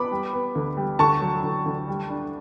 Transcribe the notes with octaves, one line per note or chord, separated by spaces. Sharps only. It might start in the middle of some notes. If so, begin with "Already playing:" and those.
Already playing: B3 B5 D6
G3
B3
D2
G3
D2 A5 C#6
F#3
D2
D2
G3
D4